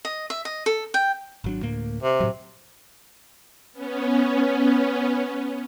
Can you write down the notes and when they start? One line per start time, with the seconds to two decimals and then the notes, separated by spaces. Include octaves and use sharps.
0.05 D#5
0.30 E5
0.45 D#5
0.66 A4
0.94 G5
1.44 G#1 F#3 D4
1.62 D2 A2 A#3
2.03 C3
2.20 A2 F#3
3.73 B3 C#4